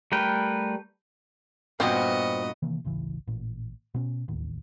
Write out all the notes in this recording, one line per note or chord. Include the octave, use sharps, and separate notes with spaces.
G3 A3 A#4 B4 G5
G2 A#2 B3 C4 F#4 C5 D#5
C3 D#3 E3 A#3
D1 A1 C#3 E3
A1 A#2
B2 C4 C#4
D1 A1 D#2